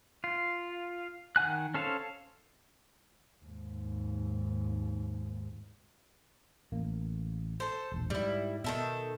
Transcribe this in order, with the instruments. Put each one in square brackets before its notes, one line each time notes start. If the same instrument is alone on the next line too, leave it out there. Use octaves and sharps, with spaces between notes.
[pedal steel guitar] F4
D#3 F#5 G#5 F#6
C#4 A4 C5 F5
[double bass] D#2 G#2
[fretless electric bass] A1 A#3
[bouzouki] A4 C5
[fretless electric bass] E1 A#1
[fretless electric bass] G#2 [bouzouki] G3 E4
[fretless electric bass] B2 [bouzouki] D#3 A4 E5